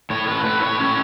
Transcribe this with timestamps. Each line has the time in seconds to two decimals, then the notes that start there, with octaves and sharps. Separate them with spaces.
0.10 A2 C#5
0.28 B4
0.45 A2 B4
0.62 C#5
0.79 C#4 C#5